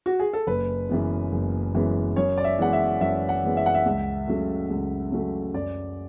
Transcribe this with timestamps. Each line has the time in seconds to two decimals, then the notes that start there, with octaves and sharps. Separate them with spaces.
0.06 F#4
0.20 G#4
0.33 A4
0.47 F#1 B4
0.90 F#2 E3 G#3 B3
1.32 F#1
1.74 F#2 E3 G#3 B3
2.16 F#2 C#5
2.38 D5
2.44 E5
2.59 E3 G#3 B3 F#5
2.73 E5
3.01 F#2 E5
3.29 F#5
3.43 E3 G#3 B3
3.57 E5
3.66 F#5
3.75 E5
3.86 C#2
4.27 C#3 F#3 A3
4.70 C#2
5.12 C#3 F#3 A3
5.54 F#2 D5